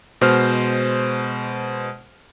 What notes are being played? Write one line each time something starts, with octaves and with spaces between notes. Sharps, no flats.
B2 G#3 C5 F6